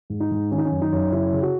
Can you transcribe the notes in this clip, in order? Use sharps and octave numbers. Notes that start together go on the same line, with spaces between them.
G#2
D#4
G#2
D#3 C#4
D#4
C#4
F#2
D#4
F#2
C#3 E4
C#3
F#4